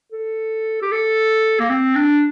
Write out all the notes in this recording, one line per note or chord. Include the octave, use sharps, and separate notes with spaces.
A4
G4
A4
A#3
C4
D4